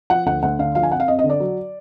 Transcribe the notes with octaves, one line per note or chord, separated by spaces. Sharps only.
F3 F#5
D2 F#5
D2 F#5
D3 F5
F3 F5
G#5
F2 F#5
F5
F2 D#5
D#5
D3
D5
F#3